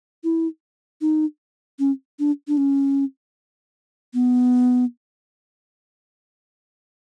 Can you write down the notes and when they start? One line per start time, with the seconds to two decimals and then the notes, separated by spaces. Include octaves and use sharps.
0.24 E4
1.01 D#4
1.79 C#4
2.19 D4
2.48 D4
2.57 C#4
4.14 B3